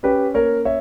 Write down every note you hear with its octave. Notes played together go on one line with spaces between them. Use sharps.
C#4 G4 B4
A#3 A#4 C#5
C#5 E5